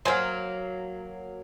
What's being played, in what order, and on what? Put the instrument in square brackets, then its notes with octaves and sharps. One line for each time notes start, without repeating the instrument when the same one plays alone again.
[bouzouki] F#3 A#3 [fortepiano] C5 G#5 [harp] A#5 F6